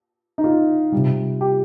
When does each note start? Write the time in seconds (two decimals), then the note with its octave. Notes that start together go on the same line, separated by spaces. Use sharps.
0.38 D#4
0.44 F4
0.92 C3 G3
1.41 G4